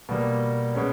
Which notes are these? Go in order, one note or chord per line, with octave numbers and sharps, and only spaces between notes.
B2 G3 A#3
B2 G#3 C#4